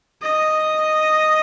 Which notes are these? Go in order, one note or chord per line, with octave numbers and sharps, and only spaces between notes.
D#5